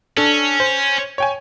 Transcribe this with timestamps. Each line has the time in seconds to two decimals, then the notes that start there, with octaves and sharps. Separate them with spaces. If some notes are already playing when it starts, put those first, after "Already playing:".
0.17 C#4 D4 A4
0.60 C5
1.18 C#5 G5 G#5